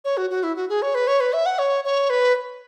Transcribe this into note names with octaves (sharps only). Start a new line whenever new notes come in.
C#5
F#4
F#4
E4
F#4
G#4
C#5
B4
C#5
B4
E5
F#5
C#5
C#5
B4